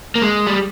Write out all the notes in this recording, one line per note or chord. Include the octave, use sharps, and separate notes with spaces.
A#3
G#3
G3